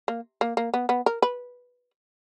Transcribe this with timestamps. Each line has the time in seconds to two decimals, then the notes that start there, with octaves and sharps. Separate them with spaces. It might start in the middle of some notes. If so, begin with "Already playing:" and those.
0.08 A#3
0.41 A#3
0.57 A#3
0.74 B3
0.89 B3
1.06 A#4
1.22 B4